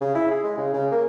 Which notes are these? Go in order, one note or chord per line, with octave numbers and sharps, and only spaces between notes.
C#3
E4
G#4
G#3
C#3
C#3
A#3